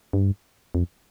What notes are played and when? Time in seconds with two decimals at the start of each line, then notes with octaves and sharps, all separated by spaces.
0.13 G2
0.75 F2